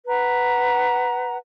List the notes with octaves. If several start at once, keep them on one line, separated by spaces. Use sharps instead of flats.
B4 F#5 A#5